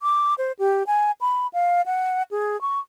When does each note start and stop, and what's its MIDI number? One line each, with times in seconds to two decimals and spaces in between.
0.02 0.34 86
0.38 0.52 72
0.59 0.83 67
0.87 1.11 80
1.21 1.47 83
1.53 1.82 77
1.86 2.23 78
2.31 2.59 68
2.61 2.79 85